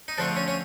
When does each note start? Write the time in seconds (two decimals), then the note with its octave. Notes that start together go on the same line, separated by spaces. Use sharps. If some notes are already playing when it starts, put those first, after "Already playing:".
0.08 D#4
0.18 D3 F3 A3 C4 D4
0.36 C#4
0.48 C#4